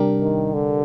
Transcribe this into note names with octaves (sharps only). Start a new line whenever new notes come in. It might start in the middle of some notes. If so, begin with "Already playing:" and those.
Already playing: C3 G3 D4 G4 A#4
D#3
D3